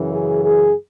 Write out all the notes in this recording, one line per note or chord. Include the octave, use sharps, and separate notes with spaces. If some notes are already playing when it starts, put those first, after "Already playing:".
Already playing: F#2 C#3 E3
G#4
G#4